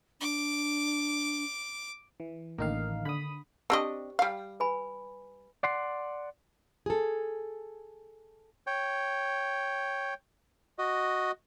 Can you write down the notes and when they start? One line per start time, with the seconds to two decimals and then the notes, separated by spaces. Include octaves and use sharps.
0.21 D4 D6
2.20 E3
2.58 A1 D3 D#3 A#3 D#4 F5
3.05 D3 B5 D#6
3.70 C4 D4 G4 D#5 G5
4.19 G3 F5
4.60 B4 G#5 B5
5.63 D5 F#5 C6
6.86 G#4 A4
8.67 C#5 G5
10.78 F#4 D#5